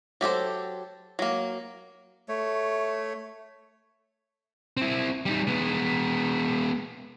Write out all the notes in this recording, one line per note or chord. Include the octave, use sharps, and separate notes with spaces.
F#3 G4 A4 C5
F#3 A#3
A3 C#5
C4 E4
G3 D#4
G#3 B3